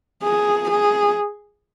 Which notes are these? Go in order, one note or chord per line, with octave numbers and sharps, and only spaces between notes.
G#4
G#4